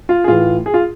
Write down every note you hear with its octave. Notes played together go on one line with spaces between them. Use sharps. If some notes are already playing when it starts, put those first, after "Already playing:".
F4
G#4
A2 E3 F4
G#4
F4